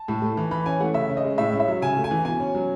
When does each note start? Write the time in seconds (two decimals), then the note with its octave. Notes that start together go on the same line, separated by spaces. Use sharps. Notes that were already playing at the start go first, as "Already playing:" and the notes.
Already playing: A5
0.08 A2
0.22 A3
0.37 E3
0.51 E3 B5
0.66 C#4 G#5
0.80 A3 F#5
0.94 C#3 E5
1.09 C#4
1.17 D#5
1.24 G#3
1.38 A2 E5
1.53 C#4
1.60 E5
1.68 F#3
1.82 C#3 G#5
1.97 A3
2.04 G#5
2.11 E3
2.25 B2 G#5
2.40 C#4
2.55 F#3